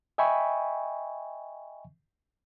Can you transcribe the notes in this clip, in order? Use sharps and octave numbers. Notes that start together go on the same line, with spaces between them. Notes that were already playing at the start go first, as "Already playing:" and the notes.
D#5 E5 G5 G#5 B5 C#6